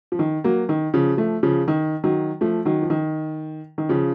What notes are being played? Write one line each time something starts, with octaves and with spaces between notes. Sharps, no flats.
F3
D#3
F#3 A#3
D#3
C#3 F3
F3 A3
C#3 F3
D#3
D#3 F#3
F3 A3
D#3 F#3
F3
D#3
D#3
C#3 F3